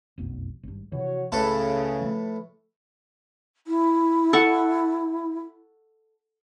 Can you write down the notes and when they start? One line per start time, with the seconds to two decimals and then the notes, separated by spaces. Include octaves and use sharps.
0.18 F1 B1 F#2
0.63 G#1 G2
0.92 C3 E3 F3 F#4 C#5
1.32 C#2 A2 C#3 A4 B4
2.02 F3 A3
3.67 E4
4.33 A4 F#5 C#6